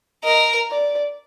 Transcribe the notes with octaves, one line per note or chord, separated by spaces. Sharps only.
A#4 D#5
D5